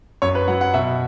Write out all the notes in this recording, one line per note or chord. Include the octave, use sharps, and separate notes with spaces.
F#2 C#5
B4
F#3 F#5
F#5
B2 E5